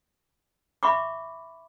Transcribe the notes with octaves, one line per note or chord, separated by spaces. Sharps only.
E5 B5 C#6 D6